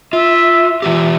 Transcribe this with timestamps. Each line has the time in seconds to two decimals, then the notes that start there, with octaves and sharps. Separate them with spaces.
0.13 F4 E5
0.82 E3 F4 G4 E5